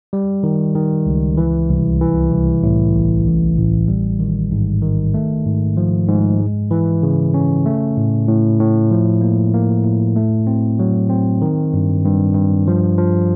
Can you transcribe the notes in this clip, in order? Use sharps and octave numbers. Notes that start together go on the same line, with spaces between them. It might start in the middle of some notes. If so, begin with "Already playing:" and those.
G3
D#3
D#3
C#2
E3
C2
E3
C2
A2
A1
A1
A1
G3
D#3
G#2
D#3
A3
G#2
F3
G#2
G#3
E3
C#3
C#4
A3
A2
A2
A2
F3
A#3
A#3
A2
A3
C4
F#3
C4
D#3
G2
G2
G2
F3
F3